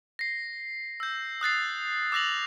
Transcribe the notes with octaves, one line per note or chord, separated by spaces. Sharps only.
A#6 C7
E6 G6
D#6 F#6 A6 C7
D6 E6 F#6 A#6 F7 F#7